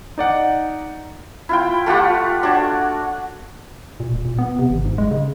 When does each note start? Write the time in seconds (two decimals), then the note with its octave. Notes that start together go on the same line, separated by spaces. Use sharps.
0.18 D#4 D5 F#5
1.49 E4 F4 G5
1.86 A3 F4 G4 F#5
2.43 D4 F#4 C#5
4.00 A#2
4.13 E1
4.25 A#2
4.38 B3
4.59 C3
4.70 G#1
4.85 G#2
4.98 G#3
5.11 C#3